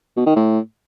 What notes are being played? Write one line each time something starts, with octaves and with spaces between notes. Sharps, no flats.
B2
D#3
A2